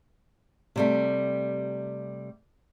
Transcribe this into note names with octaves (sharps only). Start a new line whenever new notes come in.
C3 G3 A3